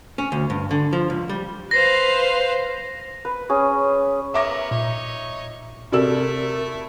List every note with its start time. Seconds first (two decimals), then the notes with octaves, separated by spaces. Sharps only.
0.18 C#4
0.32 D2
0.50 G2
0.71 D3
0.93 F3
1.10 C#2
1.29 G3
1.71 B4 C5 F5 A#6 C7
3.25 B4
3.49 C#4 G#4
4.34 B3 A#4 C#5 E5 D6 A#6
4.71 A#2 D#4 C#5
5.92 C3 A3 E4 A4 A#4 D5 E5 E6